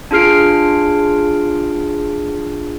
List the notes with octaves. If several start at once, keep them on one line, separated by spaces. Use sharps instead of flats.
D4 F4 G#4 F6 C7 D7